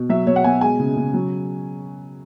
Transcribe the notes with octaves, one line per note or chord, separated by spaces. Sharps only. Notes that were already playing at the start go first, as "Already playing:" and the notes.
Already playing: B2
F#3 E5
B2 C#5
F#5
B2 G#5
G#3 G#5
C#3
C#3
F#3